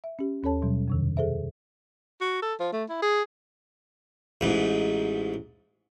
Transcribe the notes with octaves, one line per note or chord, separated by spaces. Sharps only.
E5
C#4 G4
D#2 C#4 A4 C#5 A5
B2 F#3 G3
F2 C3 D#3
G#4 A4 C5 E5
F#4
A4
F3
A3
E4
G#4
A1 G#2